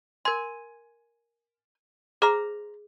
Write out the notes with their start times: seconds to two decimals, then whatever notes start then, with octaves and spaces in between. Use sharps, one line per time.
0.25 A#4 G#5 C6
2.22 G#4 C5 A#5 D6 F6